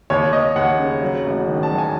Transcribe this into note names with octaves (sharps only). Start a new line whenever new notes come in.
D#2 C#5
D#2 D#5
D#2 F#5
C#3
F#3
A1
D#3
A5
F#3
G#5